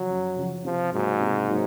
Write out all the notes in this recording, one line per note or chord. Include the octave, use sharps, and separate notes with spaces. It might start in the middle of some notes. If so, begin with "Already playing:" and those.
Already playing: C#3 F3 F#3
F#2
C#3 F3
C3 F3
G#2 F#3 A#3 D#4 F#4
C3
F#3 A#3 D#4